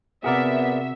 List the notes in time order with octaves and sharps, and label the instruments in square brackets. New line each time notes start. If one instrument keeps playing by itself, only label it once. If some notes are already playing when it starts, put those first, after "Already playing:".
[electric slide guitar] C3 F#4 [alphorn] B3 [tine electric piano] G#4 A#4 D5 [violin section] E5